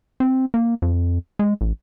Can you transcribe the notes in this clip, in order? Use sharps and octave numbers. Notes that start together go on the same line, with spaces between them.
C4
A#3
F2
G#3
A1